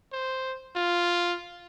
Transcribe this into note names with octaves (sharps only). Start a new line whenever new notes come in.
C5
F4